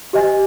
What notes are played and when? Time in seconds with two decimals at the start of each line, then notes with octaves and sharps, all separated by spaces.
0.13 G4 C5 D#5 G#5